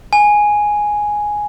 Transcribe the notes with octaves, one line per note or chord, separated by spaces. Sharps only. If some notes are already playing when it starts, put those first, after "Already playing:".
G#5